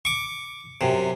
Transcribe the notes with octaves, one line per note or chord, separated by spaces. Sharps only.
C#6 D6
F#2 C3